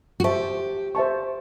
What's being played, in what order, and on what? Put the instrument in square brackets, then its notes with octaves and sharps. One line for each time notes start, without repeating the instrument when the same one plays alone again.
[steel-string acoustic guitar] F#4
[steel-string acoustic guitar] G4 [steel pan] C5 E5 A5 C#6
[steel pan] C5 E5 A5 C#6